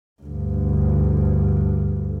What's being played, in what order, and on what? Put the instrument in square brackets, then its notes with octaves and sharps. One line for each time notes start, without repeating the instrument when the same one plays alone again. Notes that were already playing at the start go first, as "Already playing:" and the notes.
[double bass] D2 G2